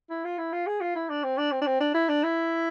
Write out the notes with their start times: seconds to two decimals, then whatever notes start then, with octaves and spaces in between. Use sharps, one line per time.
0.10 E4
0.24 F4
0.38 E4
0.52 F4
0.67 G#4
0.81 F4
0.95 E4
1.09 D4
1.24 C4
1.38 D4
1.52 C4
1.61 D4
1.67 C4
1.80 D4
1.94 E4
2.09 D4
2.23 E4